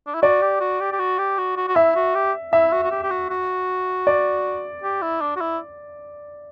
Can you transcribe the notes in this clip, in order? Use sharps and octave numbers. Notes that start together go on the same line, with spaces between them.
D4
E4
F#4 D5
G4
F#4
G4
G4
F#4
G4
F#4
F#4
F#4
E4 E5
F#4
G4
E4 E5
F#4
F#4
G4
G4
F#4
F#4
D5
G4
E4
D4
F#4
E4